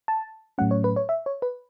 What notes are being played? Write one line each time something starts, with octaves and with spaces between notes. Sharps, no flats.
A5
A2 F#3 A3 C#4 F#5
C#5
B4
C#5
E5
C#5
B4